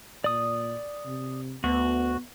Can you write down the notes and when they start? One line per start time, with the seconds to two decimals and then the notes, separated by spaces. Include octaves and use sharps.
0.24 A#2 D5 D#6
1.06 C3
1.64 D2 B3 F#4